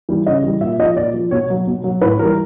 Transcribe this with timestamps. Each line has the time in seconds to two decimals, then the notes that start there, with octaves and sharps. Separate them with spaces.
0.09 E3 G3
0.26 C#3 D#5
0.44 E3 G3
0.61 A#2 E5
0.79 F3 D#5
0.96 A#2 D5
1.14 F3
1.31 B2 C#5
1.50 F#3
1.67 B2
1.84 F#3
2.01 A2 B4
2.19 E3 G3 A#4